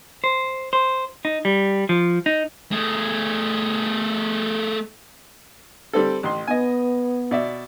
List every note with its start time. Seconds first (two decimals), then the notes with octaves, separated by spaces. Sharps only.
0.24 C5
0.73 C5
1.25 D#4
1.45 G3
1.89 F3
2.26 D#4
2.71 A3 G#4
5.93 G3 C4 A4
6.23 A1 C6
6.47 B3 D#5 G#5
7.31 B2 D5 E5